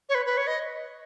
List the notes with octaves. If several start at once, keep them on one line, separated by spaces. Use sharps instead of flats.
C#5
B4
B4
C#5
D#5